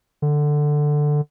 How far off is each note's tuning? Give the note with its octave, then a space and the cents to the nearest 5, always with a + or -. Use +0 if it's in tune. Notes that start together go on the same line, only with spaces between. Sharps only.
D3 +10